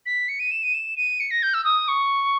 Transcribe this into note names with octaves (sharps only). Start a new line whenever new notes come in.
B6
C#7
D#7
E7
D#7
E7
D#7
C#7
A#6
G6
E6
D#6
C#6